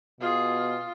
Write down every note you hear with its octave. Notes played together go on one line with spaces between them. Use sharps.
B2 F4 G#4